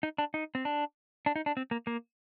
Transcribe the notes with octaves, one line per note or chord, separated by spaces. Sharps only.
D#4
D4
D#4
C4
D4
D4
D#4
D4
C4
A#3
A#3